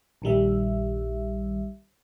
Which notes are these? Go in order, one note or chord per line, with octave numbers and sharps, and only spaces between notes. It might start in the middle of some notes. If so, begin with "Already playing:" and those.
A#1 D#3 G3 E5